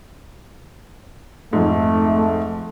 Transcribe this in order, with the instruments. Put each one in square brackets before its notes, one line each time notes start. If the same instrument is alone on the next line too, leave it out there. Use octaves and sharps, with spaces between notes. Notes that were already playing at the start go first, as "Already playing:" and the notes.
[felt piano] F2 G#2 [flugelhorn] A3